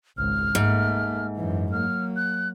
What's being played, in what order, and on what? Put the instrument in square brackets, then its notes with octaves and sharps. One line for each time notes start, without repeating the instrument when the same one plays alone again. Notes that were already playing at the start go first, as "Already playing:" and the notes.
[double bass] G#1 C#2 [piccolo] F6
[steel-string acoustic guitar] G#2 [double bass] A3 A#3
[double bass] F#2 E3
[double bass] F#3 A#3 [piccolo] F6
[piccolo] F#6